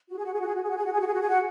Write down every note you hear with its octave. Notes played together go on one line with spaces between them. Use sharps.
F#4
G#4
F#4
G#4
F#4
G#4
F#4
G#4
F#4
G#4
F#4
G#4
F#4
G#4
F#4
G#4
F#4